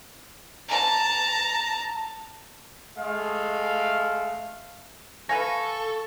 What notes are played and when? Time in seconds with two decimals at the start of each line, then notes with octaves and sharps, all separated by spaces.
0.68 A5 A#5
2.98 G#3 A3 F5
5.29 A4 B4 F5 G#5 C#6 A#6